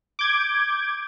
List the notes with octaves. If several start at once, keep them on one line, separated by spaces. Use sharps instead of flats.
D6 G6 G#6